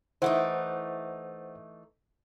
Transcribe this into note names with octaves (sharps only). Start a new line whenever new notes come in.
E3 A3 D#4 C5 F#5